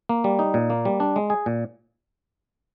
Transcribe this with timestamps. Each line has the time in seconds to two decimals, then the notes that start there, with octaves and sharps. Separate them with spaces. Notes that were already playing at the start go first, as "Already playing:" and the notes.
0.09 A#3
0.24 G3
0.39 D#4
0.54 A#2
0.70 A#3
0.85 G3
1.00 D4
1.16 G#3
1.30 G#4
1.46 A#2